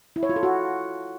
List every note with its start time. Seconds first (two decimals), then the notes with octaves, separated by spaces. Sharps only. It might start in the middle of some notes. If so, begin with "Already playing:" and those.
0.16 E4
0.23 C#5
0.29 F4
0.36 A4
0.43 F#4